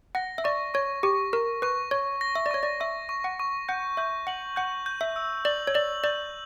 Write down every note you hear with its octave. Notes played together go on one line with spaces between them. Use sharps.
F#5 A#6
E5
D5 C#6
C#5 C#6
G4 C#6
A#4 C#6
B4 C#6
C#5 C#6
A#6
E5
D5
C#5 C#6
D5
E5 C#6
C#6
F#5
C#6
F#5 G6
E5 G6
F#5 F#7
F#5 G6
G6
E5
E6
D5 F#7
C#5
D5 F#7
D5 G6